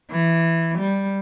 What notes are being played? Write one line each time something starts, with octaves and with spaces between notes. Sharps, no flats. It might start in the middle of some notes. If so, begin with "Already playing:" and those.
E3
G3